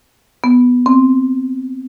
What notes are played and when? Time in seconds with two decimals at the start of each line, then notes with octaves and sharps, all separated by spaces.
0.44 B3
0.86 C4